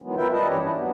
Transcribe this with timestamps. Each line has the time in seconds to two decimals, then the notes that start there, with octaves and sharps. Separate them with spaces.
0.02 D#3 E3 F#3 G#3 B3
0.17 F4 A#4 B4 E5 G5
0.33 G3 B4 D#5 A5
0.48 G2 E3 C#4 G4 C#5
0.62 D4 E4
0.76 D#2 F#3 B3